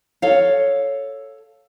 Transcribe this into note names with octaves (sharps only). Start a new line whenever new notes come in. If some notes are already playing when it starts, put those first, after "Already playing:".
A4 C#5 F5